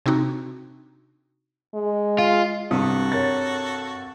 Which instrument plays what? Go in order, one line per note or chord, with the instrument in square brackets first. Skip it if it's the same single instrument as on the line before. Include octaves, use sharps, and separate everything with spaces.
[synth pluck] C3 C4 D4 D#4 F#4
[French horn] G#3
[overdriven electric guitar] F4
[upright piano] C2 [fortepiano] G2 C3 D#6 [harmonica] F#4 A4
[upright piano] A#4 C#5 A6